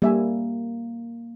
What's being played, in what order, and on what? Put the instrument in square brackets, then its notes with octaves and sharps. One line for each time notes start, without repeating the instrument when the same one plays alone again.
[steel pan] G3 E5 G#5 [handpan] A#3